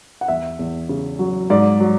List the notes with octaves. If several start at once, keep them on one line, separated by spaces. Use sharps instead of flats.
F#5
E2 E5
E2
C#3
F#3
G#2 D5
F#3